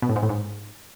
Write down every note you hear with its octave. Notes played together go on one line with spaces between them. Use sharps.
B2
A2
G#2
A2
G#2